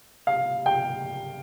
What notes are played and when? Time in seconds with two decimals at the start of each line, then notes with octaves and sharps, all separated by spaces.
0.27 F5
0.66 G5